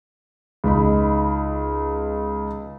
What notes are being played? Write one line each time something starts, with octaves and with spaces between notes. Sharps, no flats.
C#2 D#4 B5